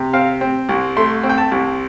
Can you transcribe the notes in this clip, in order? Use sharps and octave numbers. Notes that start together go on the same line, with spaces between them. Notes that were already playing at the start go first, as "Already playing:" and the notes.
Already playing: C3
C4 F5
C4
C2
A3 C6
C4
G5
A5
C2